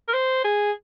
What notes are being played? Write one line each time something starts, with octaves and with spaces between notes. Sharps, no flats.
A#4
C5
G#4